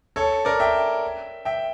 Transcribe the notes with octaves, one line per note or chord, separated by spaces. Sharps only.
A4 C#5
A#4 D5
E5 G5
E5 G5